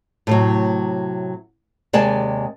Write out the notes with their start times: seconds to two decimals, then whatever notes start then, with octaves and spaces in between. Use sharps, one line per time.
0.27 A2 C3 F#3
1.93 D#2 C3 G#3 D5 G#5 A5